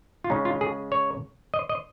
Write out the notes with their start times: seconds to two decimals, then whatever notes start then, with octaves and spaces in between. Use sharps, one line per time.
0.24 F4
0.30 C#3 G#3 C#4 D#4
0.45 F4
0.61 G#4
0.92 C#5
1.54 D#5
1.69 D#5